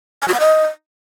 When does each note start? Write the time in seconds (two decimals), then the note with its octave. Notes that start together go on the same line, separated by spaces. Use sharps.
0.22 G#5
0.28 F#4
0.34 F#5
0.40 D#5